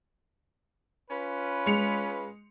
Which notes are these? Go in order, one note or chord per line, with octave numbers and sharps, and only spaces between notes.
C#4 F4 B4
G#3 C#7 F7